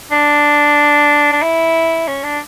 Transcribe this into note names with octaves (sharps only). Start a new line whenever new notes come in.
D4
D4
E4
C#4
D4